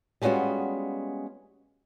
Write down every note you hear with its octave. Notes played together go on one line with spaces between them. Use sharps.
G3 G#3 B3 C#4 F4 F#4